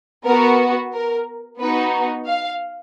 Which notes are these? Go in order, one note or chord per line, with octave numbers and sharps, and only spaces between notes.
B3 F#4 A#4
A#4
B3 D#4 F#4 B4
F5